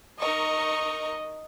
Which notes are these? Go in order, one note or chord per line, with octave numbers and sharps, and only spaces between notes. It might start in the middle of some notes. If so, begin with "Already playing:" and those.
D#4 A#4 D#5 C#6